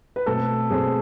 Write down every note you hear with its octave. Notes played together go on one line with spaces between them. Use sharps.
B4
B2 A3 C4 A4
B2 A3 C4 G#4